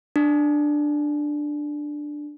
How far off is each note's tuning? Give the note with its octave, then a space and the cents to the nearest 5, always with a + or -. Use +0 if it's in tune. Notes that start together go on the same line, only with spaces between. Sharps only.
D4 +10